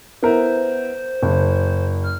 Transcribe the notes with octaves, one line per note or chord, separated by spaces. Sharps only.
B3 E4 A#4 C5
F#1
F6